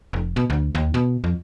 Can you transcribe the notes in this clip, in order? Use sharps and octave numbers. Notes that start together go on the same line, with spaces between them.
F1
B2
D2
D#2
B2
F2